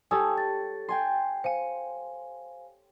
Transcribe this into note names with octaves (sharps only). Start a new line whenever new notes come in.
G4 A4 C#5 G#5 D#6 E6
A6
G5 G#5 C6
C5 F5 G#5 C#7 D#7